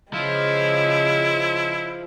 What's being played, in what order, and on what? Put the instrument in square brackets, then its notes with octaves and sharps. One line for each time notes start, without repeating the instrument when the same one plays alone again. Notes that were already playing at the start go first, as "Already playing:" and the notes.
[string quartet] C#3 G#3 [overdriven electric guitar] F3 [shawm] E4